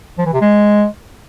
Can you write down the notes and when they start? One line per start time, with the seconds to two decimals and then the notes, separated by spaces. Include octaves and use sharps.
0.18 F3
0.26 E3
0.33 C3
0.41 G#3